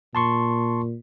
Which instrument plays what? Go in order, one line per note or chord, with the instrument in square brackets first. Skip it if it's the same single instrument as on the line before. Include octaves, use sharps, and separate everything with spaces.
[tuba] A#2 [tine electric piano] A5 C6 C#6